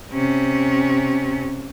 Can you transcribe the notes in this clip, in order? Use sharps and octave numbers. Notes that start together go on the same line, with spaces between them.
C3 C#4